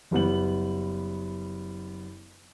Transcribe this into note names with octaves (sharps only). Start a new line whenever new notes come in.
F#1 G3 B3 F#7